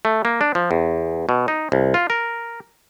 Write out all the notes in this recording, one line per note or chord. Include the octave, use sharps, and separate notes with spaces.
A3
A#3
D4
F3
E2
B2
D#4
C2
F4
A#4